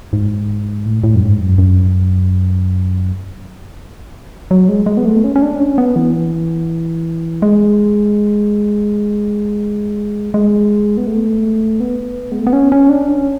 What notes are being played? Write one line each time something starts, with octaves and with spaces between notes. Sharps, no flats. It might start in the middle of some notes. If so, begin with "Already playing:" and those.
G#2
A2
A2
F#2
G#2
F#2
F#2
F#3
G#3
G#3
B3
A3
C#4
C#4
D4
C#4
B3
E3
G#3
G#3
B3
A3
B3
G#3
A3
B3
C#4
C#4
D4
C#4